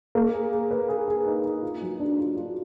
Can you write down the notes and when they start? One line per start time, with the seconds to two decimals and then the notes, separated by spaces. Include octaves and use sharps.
0.15 A#3
0.33 G#4
0.52 G#4
0.71 B4
0.89 G#4
1.08 G#4
1.26 D#4
1.44 D#4
1.63 F4
1.82 F#3
2.00 D4
2.19 F4
2.37 F4